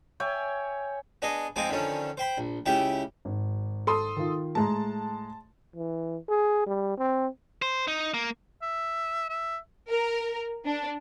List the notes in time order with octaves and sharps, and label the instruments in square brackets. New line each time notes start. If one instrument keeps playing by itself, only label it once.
[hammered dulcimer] C#5 E5 G5 G#5
[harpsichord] B3 D4 G#4 D#5
F3 G#3 C4 D#4 G#5 D6
D3 D#3 F3 C#4
C5 G5 B5
A#1
C#2 C#3 E4 G4 E5 G5
[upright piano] G#1
[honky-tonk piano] A4 C6 D#6
[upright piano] D#3 F4
[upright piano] A2 G#3 A#5 [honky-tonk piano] A5
[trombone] E3
G#4
G3
C4
[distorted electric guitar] C5
D#4
A#3
[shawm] E5
E5
[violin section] A#4
D4